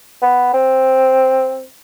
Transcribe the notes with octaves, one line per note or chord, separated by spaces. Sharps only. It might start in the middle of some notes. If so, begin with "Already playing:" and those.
B3
C4